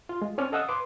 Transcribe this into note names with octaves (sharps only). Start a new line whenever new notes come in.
F4
G#3
C4 C#4 D5 F6
A4 D#5 F5 F#5 D#6 E6
B4 C6 D6